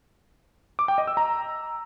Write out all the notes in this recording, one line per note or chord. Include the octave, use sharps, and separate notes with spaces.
D6
G5
D#5
E6
A#5